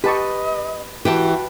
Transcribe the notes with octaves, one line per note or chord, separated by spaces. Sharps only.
G4 B4 D#5 A5 C#6
E3 F#4 G4 B4 G5 A5